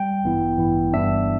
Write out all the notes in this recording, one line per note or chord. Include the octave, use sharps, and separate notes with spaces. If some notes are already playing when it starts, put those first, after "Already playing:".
Already playing: G3 G5
A1 G2 E3 B3 E4
A1 G2 E3 B3 E4
G1 G2 E3 B3 D4 E5